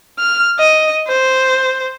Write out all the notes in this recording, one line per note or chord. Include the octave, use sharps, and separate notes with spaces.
F6
D#5
C5